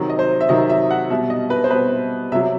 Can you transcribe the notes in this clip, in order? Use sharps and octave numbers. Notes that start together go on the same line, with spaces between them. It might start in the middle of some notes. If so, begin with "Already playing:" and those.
Already playing: C3 D#3 F#3
D#5
C5
E5
C3 D#3 F#3 D#5
E5
F#5
B2 G3 E5
D#5
B4
C5
B2 G3 B4
C3 F#3 E5